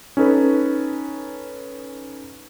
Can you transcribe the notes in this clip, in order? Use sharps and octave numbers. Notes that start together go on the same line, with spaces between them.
C#4 D#4 A4 B4